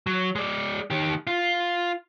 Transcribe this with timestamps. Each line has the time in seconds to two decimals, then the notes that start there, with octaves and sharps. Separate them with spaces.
0.07 F#3
0.36 G#3 D5
0.90 D#3 G4
1.27 F4